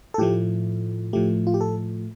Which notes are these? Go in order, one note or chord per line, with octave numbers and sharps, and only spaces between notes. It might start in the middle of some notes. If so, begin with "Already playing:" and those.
A4
A2 F3 A3 G4
A2 F3 A3 G4
F4
G4
A4